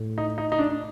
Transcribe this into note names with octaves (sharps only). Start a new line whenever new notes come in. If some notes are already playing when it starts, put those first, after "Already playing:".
Already playing: A2
D#4
D#4
D#4
D4